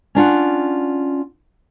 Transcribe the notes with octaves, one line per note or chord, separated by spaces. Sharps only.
C#4 D4 F4 F#5